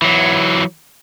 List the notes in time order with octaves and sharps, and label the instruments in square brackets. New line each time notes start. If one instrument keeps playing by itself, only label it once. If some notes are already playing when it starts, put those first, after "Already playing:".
[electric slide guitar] E3 F#3